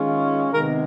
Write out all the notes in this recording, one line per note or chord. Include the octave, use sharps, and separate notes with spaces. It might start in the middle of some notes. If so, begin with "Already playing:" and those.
Already playing: D#3 G#3 C#4 F4
C3 D#3 G#3 B3 A#4